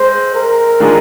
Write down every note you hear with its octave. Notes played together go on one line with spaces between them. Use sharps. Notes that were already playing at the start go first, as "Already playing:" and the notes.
Already playing: G#3 C4 C5
A#4
D#3 G#3 D4 F4 G#4